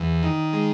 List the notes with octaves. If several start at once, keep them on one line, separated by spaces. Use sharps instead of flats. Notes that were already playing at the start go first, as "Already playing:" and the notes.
Already playing: E2
D#3
G#3